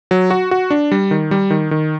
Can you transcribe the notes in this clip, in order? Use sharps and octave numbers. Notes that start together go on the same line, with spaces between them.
F#3
F#4
F#4
D4
G3
D#3
G3
D#3
D#3